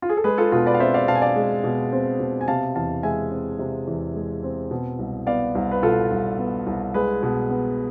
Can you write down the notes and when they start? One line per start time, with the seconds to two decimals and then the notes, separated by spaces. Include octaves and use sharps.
0.02 F4
0.09 G#4
0.17 A4
0.24 G#3 G#4 B4
0.38 F4 A4
0.52 B2 F4 A4
0.66 B4 D5
0.74 F5
0.80 C4 C5 E5
0.94 D5 F5
1.08 B2 F5 A5
1.15 G#5
1.22 D5 F5
1.36 G#3
1.64 B2
1.92 C4
2.20 B2
2.41 G#5
2.48 C3 F5 A5
2.75 E2 F5 A5
3.03 G#3 E5 G#5
3.31 C4
3.59 C3
3.87 E2
4.15 G#3
4.44 C4
4.71 B2
4.99 C2
5.27 B3 D5 F5
5.55 C2
5.71 B4
5.83 B2 F4 A4
6.11 C2
6.39 B3
6.67 C2
6.94 G#3 G#4 B4
7.23 B2
7.50 B3